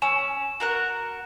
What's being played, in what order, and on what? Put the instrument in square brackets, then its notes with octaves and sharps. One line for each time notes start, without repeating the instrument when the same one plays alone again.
[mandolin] C#4 [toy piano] G#5 E6 [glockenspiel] E7
[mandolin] F#4 A#4 F#5